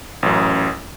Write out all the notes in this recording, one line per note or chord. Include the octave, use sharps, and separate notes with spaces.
A1 F#2